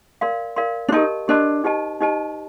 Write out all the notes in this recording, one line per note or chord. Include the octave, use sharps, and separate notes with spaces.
A#4 D5 F5 C6
A#4 D5 F5 C6
D4
D#4 G4 A#4 D#5 A5 C6
D4 G4 A#4 D#5 A5 C6
D#4 G4 C5 D#5 A5
D#4 G4 C5 D#5 A5